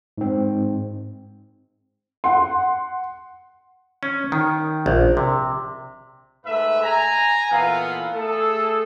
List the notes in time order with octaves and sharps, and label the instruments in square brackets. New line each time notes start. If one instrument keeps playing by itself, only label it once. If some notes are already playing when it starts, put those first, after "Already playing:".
[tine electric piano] G#2 C4
[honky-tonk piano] F#5 C6
[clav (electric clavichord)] C#4
D#3
A#1
C3
[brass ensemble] G#2 A3 B4 E5
G#5 A#5
A#2 E3 B3 A4 F5
A3 G#4 A4